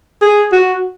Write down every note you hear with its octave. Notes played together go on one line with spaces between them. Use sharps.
G#4
F#4